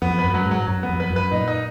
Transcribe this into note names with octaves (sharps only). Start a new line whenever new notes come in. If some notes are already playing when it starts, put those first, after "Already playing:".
F2 B3
B4
F#2
F#3
G#2
F#3
F#2 F#3
B3
F2
B4
F#2
B4
A#2 D#4
D#4